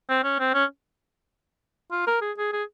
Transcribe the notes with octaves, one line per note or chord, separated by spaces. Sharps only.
C4
C#4
C4
C#4
F4
A#4
G#4
G#4
G#4